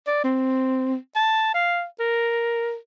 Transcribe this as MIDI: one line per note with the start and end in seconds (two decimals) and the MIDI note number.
0.07 0.22 74
0.24 0.96 60
1.16 1.49 81
1.54 1.84 77
1.99 2.76 70